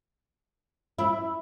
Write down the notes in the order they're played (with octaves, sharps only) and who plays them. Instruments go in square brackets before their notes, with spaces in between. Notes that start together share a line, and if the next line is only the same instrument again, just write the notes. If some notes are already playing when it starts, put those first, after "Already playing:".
[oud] E4